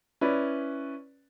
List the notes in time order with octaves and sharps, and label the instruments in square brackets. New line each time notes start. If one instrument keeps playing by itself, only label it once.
[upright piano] C#4 E4 B4 D5